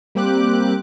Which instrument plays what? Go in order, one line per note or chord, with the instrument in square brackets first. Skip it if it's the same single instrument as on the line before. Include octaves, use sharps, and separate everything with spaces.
[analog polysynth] G3 A#3 C4 G4 D6 F#6